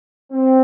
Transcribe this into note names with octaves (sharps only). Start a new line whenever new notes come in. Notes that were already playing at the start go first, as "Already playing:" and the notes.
C4